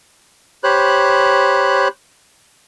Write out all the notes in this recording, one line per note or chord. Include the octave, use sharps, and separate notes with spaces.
G4 C5 C#5 B5 F#6